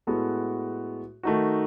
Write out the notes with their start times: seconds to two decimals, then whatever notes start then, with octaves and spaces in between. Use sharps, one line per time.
0.07 A2 G#3 B3 F#4 A4
1.23 D#3 A3 D#4 F#4